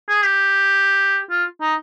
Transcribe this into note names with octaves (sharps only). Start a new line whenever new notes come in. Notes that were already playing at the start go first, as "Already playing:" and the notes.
G#4
G4
F4
D#4